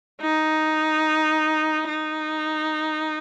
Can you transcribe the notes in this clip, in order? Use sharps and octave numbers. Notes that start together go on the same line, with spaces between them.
D#4
D#4